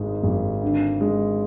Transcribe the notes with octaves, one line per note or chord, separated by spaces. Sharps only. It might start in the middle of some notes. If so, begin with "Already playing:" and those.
Already playing: G#1 G#2 G#3
G#1
D3
G#3